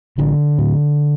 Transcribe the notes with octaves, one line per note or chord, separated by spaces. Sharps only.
A1 D3
A2